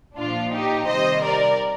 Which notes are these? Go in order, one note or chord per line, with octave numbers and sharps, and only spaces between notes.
A#2 F3 D4 F4
D#4 G4
C3 D#3 G3 C5 D#5
A#4 D5